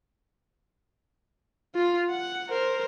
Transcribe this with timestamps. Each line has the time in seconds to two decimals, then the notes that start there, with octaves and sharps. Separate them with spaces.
1.75 F4
2.11 F#5
2.49 A#4 C5